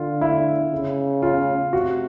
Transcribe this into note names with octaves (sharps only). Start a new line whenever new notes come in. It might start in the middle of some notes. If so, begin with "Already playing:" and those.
Already playing: D3 F4
E4
C#3
F4
C3 F#4